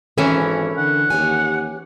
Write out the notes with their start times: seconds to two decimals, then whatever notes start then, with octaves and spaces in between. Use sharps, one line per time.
0.18 G#1 E3 C#4 E4 A4 A#4 E5
0.78 D3 F#5
1.10 D#2 G4 C#5 G#5